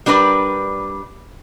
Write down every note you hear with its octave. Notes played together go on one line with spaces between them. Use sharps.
G3 D4 A#4 B4 D5